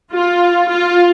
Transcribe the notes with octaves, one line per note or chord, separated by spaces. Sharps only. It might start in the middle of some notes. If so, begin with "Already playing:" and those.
F4
F4